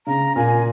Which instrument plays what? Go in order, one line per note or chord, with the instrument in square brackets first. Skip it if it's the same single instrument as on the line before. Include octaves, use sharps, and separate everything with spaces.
[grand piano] C#3 [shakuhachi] A#5
[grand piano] A#2 [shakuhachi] G#5